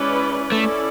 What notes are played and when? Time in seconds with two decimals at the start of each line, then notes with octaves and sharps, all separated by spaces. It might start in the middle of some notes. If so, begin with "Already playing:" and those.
Already playing: G#3 C#4 E4 B4 D5
0.52 A3 C#4 E4 A4 D5